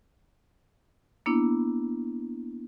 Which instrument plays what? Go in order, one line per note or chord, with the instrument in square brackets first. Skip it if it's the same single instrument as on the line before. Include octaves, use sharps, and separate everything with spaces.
[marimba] A#3 B3 D4 E4